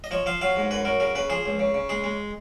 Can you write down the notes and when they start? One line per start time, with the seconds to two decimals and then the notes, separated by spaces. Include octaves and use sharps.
0.04 D#5
0.11 F3 C#5
0.26 F3 F5
0.41 F#3 F5
0.56 G#2
0.71 F#2 B4
0.85 F#3 A#4
1.00 C#3 A#4
1.15 C#3 B4
1.30 F3 G#4
1.46 C#2
1.59 C#3
1.74 C#3
1.89 G#3 G#4
2.04 G#3